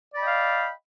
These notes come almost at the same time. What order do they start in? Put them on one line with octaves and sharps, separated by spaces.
D5 B5 D#5 G5 F5